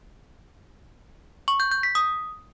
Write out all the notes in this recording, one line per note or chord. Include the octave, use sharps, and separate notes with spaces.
C#6
G6
G6
B6
D#6